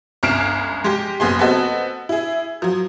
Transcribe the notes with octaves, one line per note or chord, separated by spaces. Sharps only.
G1 C#2 F6 C7 D7 E7
G#3 G4
F#1 B3 G#4 C6
B3 C4 F#4 A4 D#5
E4 G#4
F3 F#3